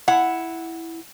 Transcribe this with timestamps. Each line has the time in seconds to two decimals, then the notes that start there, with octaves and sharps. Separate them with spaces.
0.08 E4 F#5